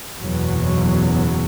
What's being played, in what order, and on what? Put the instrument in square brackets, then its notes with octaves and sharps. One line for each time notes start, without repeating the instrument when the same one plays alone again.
[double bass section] F#1 E2 B2 F#3